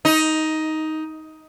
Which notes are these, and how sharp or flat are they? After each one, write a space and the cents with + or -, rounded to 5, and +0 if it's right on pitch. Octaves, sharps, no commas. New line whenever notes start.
D#4 +10